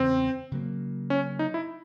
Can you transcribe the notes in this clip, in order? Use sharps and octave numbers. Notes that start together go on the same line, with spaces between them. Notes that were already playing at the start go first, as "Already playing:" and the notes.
Already playing: E2 C#3 E3 G#3 C4
C#3 F#3 A#3
C#4
D#4
E4